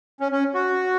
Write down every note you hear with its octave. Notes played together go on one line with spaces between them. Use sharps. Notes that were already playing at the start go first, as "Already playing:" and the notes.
C#4
C#4
F#4